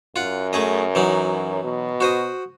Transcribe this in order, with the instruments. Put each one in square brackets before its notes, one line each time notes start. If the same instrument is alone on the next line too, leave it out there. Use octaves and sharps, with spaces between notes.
[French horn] F#2 [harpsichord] F4 F#5
[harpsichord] A3 G#4 D#5
E3 F#3 D#4
[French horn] B2
[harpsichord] F#4 C5 D#6